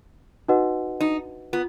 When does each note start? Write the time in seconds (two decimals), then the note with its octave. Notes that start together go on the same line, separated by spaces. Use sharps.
0.48 D#4 F#4 B4 D#5 F#5
1.01 D#4
1.53 B3 F4